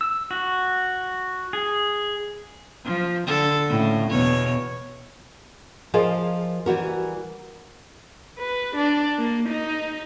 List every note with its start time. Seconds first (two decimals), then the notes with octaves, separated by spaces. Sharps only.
0.01 E6
0.31 F#4
1.53 G#4
2.85 F3
3.27 D3 A4
3.69 A2 C#3
4.10 E2 B2 C#5
5.94 F3 F4 G#4 A#4 D#5
6.66 E3 G3 F#4 A#4
8.39 B4
8.76 D4
9.18 A#3
9.49 D#4